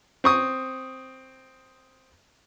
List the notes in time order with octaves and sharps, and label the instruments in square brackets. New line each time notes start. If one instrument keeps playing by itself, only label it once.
[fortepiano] C4 C#6 D#6